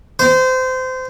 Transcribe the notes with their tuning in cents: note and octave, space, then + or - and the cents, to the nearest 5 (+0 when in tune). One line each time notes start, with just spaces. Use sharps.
C5 -25